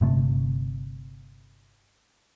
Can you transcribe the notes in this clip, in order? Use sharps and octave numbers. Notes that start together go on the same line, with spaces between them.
G1 C3 A3